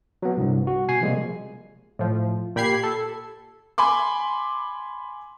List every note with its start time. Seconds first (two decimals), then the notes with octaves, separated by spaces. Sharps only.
0.22 F#3 B3
0.37 C2 G2
0.67 F#4
0.88 B2 G#5 C7
1.01 C3 F3 G3 G#3 A#3
1.99 A2 F3
2.56 A#2 G4 B5 G#6 C7
2.83 A4
3.78 G#5 B5 C6 D6